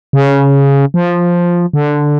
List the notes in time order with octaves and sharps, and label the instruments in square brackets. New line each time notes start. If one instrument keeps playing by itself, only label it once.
[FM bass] C#3
F3
D3